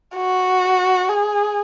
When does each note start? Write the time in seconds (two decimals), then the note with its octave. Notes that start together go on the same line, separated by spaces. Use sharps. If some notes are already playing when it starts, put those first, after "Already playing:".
0.15 F#4
1.09 G#4